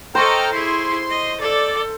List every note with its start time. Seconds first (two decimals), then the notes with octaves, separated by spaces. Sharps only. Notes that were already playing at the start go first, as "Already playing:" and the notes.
0.15 A4 C5 D#5 G5 A#5 C#6 F6
0.52 E4 G#4 C6
1.09 D#5
1.41 A4 D5